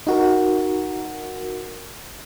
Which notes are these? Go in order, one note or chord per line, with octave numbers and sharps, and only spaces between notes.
D#4 F#4 A#4